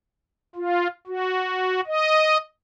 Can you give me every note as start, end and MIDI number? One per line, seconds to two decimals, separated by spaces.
0.56 0.88 65
1.07 1.80 66
1.87 2.37 75